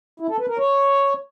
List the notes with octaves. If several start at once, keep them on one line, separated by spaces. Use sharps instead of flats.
E4
A4
B4
A#4
C#5